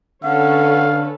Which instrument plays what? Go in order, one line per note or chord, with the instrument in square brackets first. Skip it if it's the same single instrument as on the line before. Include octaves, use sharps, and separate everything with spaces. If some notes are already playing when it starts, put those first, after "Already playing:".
[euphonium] D3 [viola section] C#4 A4 B4 [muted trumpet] F5 [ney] F#5